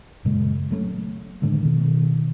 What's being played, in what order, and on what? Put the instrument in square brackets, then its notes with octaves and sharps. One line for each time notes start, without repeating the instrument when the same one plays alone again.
[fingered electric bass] F#2 A#2 C#3 G#3
F#3 A3 B3 C#4
A2 D3 D#3 G#3
B2 D#3